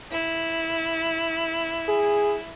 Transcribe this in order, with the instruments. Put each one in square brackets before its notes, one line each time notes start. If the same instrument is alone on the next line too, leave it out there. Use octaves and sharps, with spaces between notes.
[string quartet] E4
[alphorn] G#4